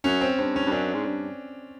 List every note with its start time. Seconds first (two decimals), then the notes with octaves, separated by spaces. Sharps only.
0.04 F#2 C#4
0.21 C4
0.38 G2 C4
0.56 C#4
0.66 G2
0.72 F#2 D4
0.94 G#2
1.06 G2